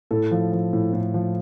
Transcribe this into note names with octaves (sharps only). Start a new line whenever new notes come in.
A2 A4
F3
F3
A2
A2
F3